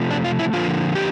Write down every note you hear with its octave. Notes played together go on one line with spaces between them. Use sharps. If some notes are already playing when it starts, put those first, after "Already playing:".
Already playing: C3 F3 A3
D4
F4
E4
D3 F3 A#3 F4
G4